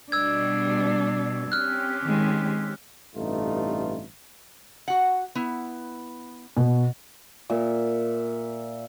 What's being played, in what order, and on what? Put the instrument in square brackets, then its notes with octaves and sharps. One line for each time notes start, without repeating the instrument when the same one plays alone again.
[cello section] B2 G3 [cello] D4 [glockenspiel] E6 G#6
[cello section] C4 C#4 G4 [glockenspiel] F6 F#6
[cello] D#3 G#3
[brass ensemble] A1 G2 C3 A3 D#4 F4
[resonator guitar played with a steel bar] F#4 F#5
B3 E4
[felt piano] B2
[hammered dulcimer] A#2 E5